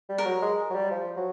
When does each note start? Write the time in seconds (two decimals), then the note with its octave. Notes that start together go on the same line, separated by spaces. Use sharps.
0.09 G3
0.18 A#4
0.26 F#3
0.42 G#3
0.70 F#3
0.75 G3
0.91 F3
1.17 F#3